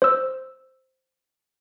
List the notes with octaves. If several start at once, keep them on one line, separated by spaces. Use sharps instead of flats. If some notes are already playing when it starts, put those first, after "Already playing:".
C5 E6